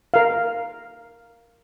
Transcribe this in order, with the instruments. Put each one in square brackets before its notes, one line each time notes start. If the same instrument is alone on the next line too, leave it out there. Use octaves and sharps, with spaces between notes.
[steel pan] A#4 F5